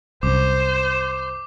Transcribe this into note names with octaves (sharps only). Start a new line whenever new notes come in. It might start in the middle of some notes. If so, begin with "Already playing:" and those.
C2 F#2 C5 D6